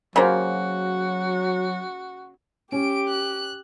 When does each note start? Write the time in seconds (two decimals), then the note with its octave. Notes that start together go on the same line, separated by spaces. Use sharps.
0.16 C#3 F#3 A#3 F#4 C5 A#5
2.72 C#4 G4 D7
3.08 F#6